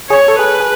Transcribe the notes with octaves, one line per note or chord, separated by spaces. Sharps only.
G#4 C#5
A4
G#4 B4
G#4